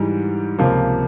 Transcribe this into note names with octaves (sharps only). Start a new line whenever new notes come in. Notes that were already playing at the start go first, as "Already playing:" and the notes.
Already playing: G#2 E3 G3
C#2 C3 F3 A#3